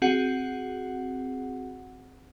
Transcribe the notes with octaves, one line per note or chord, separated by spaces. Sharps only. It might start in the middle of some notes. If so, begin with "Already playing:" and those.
C4 F#4 G#4 F#5